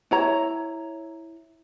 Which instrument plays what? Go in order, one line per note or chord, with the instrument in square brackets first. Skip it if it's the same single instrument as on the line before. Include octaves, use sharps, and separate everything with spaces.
[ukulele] E4 C#5 A#5